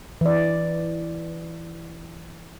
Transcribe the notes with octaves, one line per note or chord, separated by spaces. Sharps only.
E3 D5